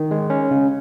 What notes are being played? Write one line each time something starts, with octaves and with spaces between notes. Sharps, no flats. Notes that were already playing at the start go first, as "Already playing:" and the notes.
Already playing: D#3
G#3
C#4
C#3